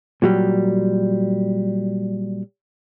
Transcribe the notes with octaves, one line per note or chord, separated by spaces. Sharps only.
A#2 F#3 G3